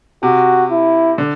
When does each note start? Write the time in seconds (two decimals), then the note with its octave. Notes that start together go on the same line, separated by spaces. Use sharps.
0.23 C3 F#4
0.71 E4
1.18 D3